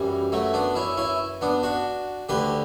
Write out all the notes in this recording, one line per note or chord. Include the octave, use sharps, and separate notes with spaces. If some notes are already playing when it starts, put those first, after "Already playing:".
Already playing: F#2 E3 G3
F#3 A3
B3 D4
C#4 E4
C#4 E4
B3 D4
D4 F#4
D2 D3 G4 B4